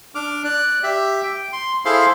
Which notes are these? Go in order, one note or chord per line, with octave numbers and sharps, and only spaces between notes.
D4 D6 F6
D5 F#6
G4 E5
G5
C6
E4 G#4 A4 C5 F5 C6